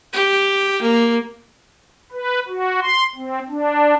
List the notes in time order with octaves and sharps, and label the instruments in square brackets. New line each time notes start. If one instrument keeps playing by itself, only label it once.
[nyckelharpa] G4
A#3
[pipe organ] B4
F#4
C6
C4
D4